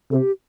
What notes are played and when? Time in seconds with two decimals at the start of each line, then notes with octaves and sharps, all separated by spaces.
0.11 C3 A4
0.15 G4